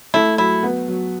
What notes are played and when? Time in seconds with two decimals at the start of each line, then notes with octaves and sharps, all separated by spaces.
0.14 A3 E4
0.38 F#3 E4
0.63 B3
0.88 F#3